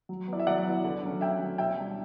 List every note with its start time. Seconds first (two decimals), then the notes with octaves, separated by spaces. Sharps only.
0.09 F#3
0.28 B3 E4 D5
0.40 E5
0.47 F#3 D5 F#5
0.65 B3 E4
0.84 D3
1.03 F#3 C#4
1.21 D3 E5 G5
1.40 F#3 C#4
1.58 B2 E5 G5
1.77 G3 D4